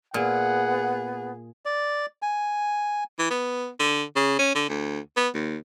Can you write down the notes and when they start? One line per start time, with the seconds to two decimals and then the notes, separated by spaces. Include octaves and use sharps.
0.14 A#2 B3 G#4 F#5
1.65 D5
2.22 G#5
3.19 E3
3.31 B3
3.79 D3
4.16 C#3
4.39 C#4
4.55 D3
4.69 D2
5.17 B3
5.34 D#2